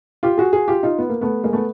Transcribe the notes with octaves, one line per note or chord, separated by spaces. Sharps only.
F4 G4
F#4 G#4
F#4 G#4
F4 G4
D#4 F4
B3
A#3
A3 B3
G#3 A#3
A3 B3